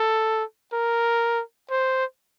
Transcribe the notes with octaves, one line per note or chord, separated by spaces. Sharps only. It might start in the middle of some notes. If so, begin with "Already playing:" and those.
Already playing: A4
A#4
C5